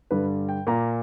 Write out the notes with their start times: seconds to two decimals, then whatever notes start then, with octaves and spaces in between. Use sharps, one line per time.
0.11 G2 D3 G3 B4
0.49 G5
0.67 A#2 A#3 A#5